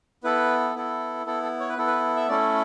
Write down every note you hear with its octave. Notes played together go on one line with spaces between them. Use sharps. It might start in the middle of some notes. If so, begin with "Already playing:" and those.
B3 E4 A4 B4
B3 E4 A4
B3 E4 A4
A4
C#5
B4
B3 E4 A4
B4
E5
A3 C#4 E4 A4 D5